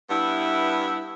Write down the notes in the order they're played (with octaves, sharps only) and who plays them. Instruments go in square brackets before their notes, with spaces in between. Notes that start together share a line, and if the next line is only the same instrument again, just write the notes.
[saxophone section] G2 B3 E4